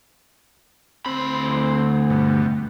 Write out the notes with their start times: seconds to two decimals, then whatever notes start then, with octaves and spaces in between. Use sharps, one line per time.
1.06 D2 C4 B5
2.10 G2 B2